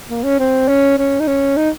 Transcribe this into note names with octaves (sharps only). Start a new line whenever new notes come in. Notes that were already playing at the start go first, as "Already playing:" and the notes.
A#3
C#4
C4
C#4
C#4
D#4
C#4
D#4